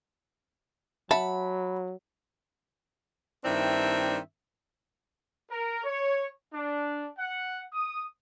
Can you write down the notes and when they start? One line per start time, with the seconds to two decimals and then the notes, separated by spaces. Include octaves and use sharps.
1.11 F#3 E5 F#5 A5 B5
3.44 G2 D#3 C4 D4 E4 E5
5.50 A#4
5.84 C#5
6.53 D4
7.18 F#5
7.73 D#6